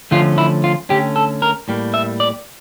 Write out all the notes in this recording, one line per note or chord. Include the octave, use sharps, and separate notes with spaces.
D3 F3 A3 C#4 F4
E4
F4
D3 A3 C#4 G4
A4
A#4
A2 G3 A#3
E5
D5